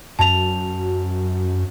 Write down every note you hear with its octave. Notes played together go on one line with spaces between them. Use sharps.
F#2 A5 F7